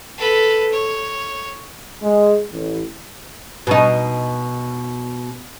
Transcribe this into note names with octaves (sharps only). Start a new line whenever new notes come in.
A4 B4
C#5
G#3
A1
B2 D#4